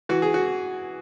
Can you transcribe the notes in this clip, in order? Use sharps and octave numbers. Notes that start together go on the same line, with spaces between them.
E3 F#4
G#4
F#4